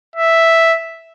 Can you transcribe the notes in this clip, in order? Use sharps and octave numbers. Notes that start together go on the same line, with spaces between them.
E5